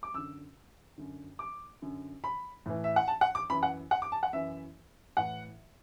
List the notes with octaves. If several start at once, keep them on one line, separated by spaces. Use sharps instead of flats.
D6
F#2 D3 E6
F#2 D3
D6
F#2 D3
B5
A2 E3
E5
F#5
A5
F#5
D6
F#2 E3 B5
F#5
F#5
D6
A5
F#5
F#2 E3 E5
A2 E3 F#5